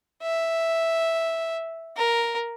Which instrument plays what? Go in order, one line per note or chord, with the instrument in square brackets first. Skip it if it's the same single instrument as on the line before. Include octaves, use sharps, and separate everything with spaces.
[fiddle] E5
A#4